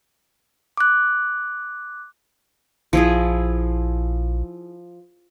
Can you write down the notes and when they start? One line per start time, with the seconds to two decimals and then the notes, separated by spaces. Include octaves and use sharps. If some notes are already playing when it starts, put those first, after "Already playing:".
0.77 D6 F#6
2.93 A#1 F3 E4 G#4